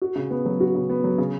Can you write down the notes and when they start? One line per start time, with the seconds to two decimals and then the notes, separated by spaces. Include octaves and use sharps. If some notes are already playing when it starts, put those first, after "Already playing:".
0.02 F#4
0.16 C#3
0.30 B3
0.46 F#3
0.60 F#4
0.75 C#3
0.90 B3
1.04 F#3
1.18 C#3